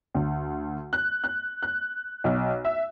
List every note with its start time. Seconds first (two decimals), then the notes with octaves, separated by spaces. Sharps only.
0.14 D2
0.93 F#6
1.24 F#6
1.63 F#6
2.24 B1
2.65 E5